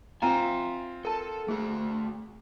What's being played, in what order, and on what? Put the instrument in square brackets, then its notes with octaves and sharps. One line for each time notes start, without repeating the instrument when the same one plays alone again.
[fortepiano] C4 F4 [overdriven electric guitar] E5 G#5 [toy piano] A#5
[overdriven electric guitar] A4 [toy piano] A#4 A5
[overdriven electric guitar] A3 F#4 [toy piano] G#4